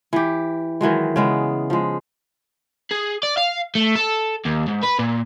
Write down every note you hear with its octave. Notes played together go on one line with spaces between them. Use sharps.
E3 G4
D#3 E3 F#3 G#3
C#3 G#3 B3
F3 G#3
G#4
D5
F5
A3
A4
D#2
G#2
B4
A#2